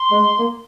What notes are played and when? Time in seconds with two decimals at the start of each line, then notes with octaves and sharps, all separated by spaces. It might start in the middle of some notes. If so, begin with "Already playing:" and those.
Already playing: C6
0.11 G#3
0.38 A#3